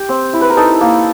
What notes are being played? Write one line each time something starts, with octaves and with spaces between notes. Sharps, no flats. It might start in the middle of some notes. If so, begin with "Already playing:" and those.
Already playing: G4
C4
E4
B4
A#4
D#4 A4
A#3